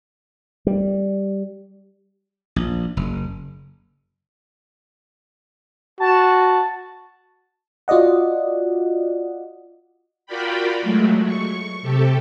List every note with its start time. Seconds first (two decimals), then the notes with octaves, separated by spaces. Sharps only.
0.67 G3
2.56 A#1
2.97 F#1
6.00 F#4 A5
7.88 F4 F#4 D5 D#5 F#5
10.26 F4 F#4 A#4 D5 G5 B5
10.81 F#3 G#3 A3
11.25 C#6
11.82 C3 G4 A4